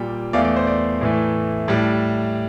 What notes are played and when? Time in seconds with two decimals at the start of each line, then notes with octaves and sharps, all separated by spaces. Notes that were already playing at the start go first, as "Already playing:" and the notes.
Already playing: A#2 G3 G5
0.33 E2 E3 A3 D5 F5
0.45 D5
0.56 C5
0.67 D5
1.01 A2 E3 A3
1.68 A2 G3